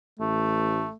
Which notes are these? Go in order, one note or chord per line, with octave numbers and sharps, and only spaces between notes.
A1 A3